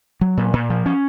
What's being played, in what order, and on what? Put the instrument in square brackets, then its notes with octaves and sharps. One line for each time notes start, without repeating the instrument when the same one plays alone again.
[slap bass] F#3
A#2
A#2
F3
C#4